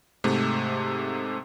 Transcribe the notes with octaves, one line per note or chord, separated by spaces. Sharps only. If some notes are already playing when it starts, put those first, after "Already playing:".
G#2 C3 A3